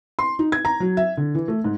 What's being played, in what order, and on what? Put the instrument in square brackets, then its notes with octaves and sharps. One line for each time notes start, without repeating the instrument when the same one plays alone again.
[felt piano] C6
D#4
G#6
A#5
F#3
E5
D3
E3
A3
G#2